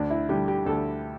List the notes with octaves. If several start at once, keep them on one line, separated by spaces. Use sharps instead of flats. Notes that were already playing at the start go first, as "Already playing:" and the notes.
Already playing: D2 D4
E4
D3 G3 G4
G4
D2 A4